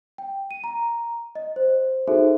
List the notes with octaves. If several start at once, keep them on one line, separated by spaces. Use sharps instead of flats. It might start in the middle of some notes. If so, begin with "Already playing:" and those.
G5
D#7
A#5
D#5
C5
D#4 F#4 G#4 A4 C5 E5